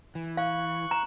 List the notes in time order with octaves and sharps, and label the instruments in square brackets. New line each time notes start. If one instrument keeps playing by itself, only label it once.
[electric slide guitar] E3
[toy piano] F5 [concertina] C#6 F#6
[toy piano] A#5